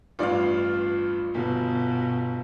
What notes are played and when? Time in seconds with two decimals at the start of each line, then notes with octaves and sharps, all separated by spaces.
0.19 A1 G2 F4 D5 F5
1.35 G1 B2